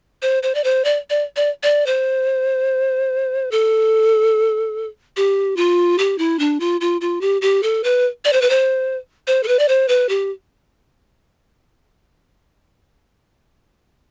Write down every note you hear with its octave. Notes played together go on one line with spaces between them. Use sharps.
C5
C5
D5
C5
D5
D5
D5
D5
C5
A4
G4
F4
G4
E4
D4
F4
F4
F4
G4
G4
A4
B4
D5
C5
B4
C5
C5
A4
B4
D5
C5
B4
G4